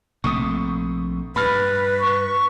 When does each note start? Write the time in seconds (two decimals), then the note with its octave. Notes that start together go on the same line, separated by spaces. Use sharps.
0.24 A#1 C3 A3 C#6 D#6
1.36 G2 B4 B5 F6
2.01 C#6